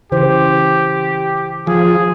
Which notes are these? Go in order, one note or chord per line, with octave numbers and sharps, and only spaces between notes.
C#3 E3 G4 C5
F3 G#4